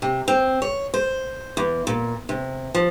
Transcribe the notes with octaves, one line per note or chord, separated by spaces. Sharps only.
C3
C4
C#5
C5
E2
A#2
C3
F3